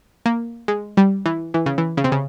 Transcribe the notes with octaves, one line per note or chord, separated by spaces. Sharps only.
A#3
G#3
G3
E3
E3
C#3
E3
C#3
C3
C#3